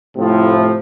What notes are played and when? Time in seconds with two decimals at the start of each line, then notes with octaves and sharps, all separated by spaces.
0.17 A2 C3 F3